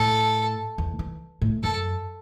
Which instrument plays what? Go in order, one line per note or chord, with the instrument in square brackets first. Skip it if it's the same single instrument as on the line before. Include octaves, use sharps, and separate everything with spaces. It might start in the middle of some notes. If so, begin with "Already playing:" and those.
Already playing: [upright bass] A2 [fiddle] A4
[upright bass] E2
E3
A2
[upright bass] F#2 [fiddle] A4